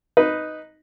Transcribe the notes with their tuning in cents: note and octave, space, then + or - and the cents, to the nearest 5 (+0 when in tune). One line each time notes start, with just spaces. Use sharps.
D#4 +0 B4 +0